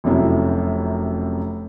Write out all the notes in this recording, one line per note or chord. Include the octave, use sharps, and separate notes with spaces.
F1 F#2 C3 E4